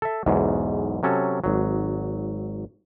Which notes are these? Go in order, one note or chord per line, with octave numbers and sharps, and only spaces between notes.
A4 E5
B1 E2 G#2
C3 F#3 C#4 A4
G#1 F#3